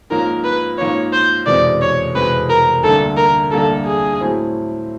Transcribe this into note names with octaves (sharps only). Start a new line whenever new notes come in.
G#2 F3 A#3 C#4 A#4
B4
G#2 F3 A#3 C#4 C#5
C5
F1 E2 B2 G#3 C4 D5
C#5
F1 E2 B2 G#3 C4 B4
A#4
D2 D3 G3 A#3 D4 A4
A#4
D2 D3 G3 A#3 D4 A4
G#4
A2 F#3 A3 C4 E4